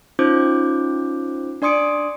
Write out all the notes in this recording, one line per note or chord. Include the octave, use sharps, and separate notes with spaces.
C#4 D#4 F4 C5 D6 G6
D4 D5 C6 D#6 C#7 D7